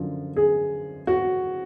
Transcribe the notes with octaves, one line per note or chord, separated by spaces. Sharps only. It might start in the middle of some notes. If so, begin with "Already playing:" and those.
Already playing: F#2 D3 F3 F4
G#4
F#4